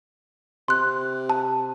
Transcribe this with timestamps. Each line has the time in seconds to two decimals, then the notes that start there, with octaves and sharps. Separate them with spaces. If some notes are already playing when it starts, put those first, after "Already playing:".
0.68 C3 C6 F#6
1.30 A5